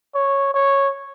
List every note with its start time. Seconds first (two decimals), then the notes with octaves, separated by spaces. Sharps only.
0.15 C#5
0.54 C#5